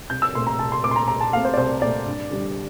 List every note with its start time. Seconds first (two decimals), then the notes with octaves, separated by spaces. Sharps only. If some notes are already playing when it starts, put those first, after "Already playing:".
0.10 C2 G6
0.22 E6
0.35 A#2 A3 C4 C6
0.47 A#5
0.59 C2 A5
0.72 C6
0.83 A#2 A3 C4 D6
0.91 C6
0.96 A#5
1.08 C2 A#5
1.21 A5
1.33 A#2 A3 C4 F5
1.45 C5
1.54 D5
1.57 C2 C5
1.82 A#2 A3 C4 D5
2.06 G2
2.31 D3 G3 D4